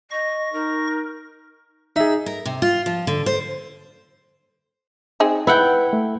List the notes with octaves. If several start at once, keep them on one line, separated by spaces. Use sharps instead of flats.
D#5 C#6 A#6
D#4 A#4
D#4 G#4 E5
A#4
C3
F4
F3
D3
C5
C4 D#4 G#4
E4 B4 F#5 G5
A3